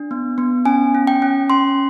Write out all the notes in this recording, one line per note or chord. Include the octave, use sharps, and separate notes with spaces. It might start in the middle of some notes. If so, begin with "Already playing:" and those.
Already playing: D4
B3
B3
C#4 G#5
C#4
G5
C#4
C#4 C6